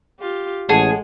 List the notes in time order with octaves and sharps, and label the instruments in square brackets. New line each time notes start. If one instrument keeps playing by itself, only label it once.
[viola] F4 G4
[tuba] A1 [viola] G#3 [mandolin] G#4 [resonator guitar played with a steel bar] C#5 F#5 A5